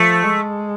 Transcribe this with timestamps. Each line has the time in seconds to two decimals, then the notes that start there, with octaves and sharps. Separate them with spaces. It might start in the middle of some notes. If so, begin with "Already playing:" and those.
Already playing: F3 A3
0.24 G#3